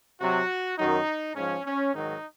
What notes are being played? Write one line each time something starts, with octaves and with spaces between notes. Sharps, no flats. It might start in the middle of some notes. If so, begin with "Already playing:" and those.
C3 F#3 F#4
F#2 D#3 F#3 D#4
G#2 F3 C#4
C#4
G#2 D#3 F#3 D#4